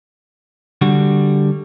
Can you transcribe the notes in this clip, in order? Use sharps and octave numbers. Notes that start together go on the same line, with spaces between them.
D3 G3 F#4